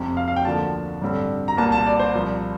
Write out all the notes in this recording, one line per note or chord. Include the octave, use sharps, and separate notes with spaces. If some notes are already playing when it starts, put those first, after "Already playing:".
Already playing: F1 F2 C3
F5
F5
G5
D2 D3 F3 A#3 A5
A1 G2 D3 G3 C4
A#5
C2 A#2 G3 A#3 A5
A5
D5
C5
C2 A#2 F3 A#3